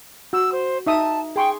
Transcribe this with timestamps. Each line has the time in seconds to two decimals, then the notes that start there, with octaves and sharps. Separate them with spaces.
0.33 F#4 E6
0.52 C5
0.86 D#4 E5 A5 D#6
1.36 G#4 G5 C6 C#6